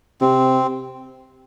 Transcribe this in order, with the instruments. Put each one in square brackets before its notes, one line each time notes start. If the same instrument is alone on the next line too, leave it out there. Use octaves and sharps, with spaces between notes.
[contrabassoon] C3 [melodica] C4